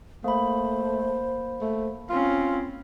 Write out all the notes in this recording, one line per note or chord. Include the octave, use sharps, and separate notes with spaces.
A3 A#3 C5 B5
A3
C4 C#4 F4